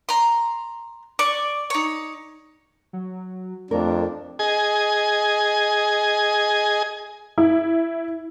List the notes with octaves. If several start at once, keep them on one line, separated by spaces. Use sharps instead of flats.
A#5 C6
D5 C#6
D#4 C#5
F#3
F2 A3 D4 A#4
G#4 D#5 G#5
E4